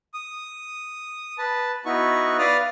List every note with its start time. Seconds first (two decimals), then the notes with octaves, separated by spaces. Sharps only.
0.14 D#6
1.38 B4 A5
1.86 B3 D#4 E4 F#4 B4 C#6
2.39 B4 D5 F5 D#6 F6